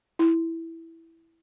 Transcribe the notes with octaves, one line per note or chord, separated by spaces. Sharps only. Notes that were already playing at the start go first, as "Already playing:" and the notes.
E4